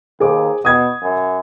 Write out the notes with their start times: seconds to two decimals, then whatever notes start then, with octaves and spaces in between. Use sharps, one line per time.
0.20 D#2 G#4 C5 D6
0.65 B2 D#6 G#6
1.03 F#2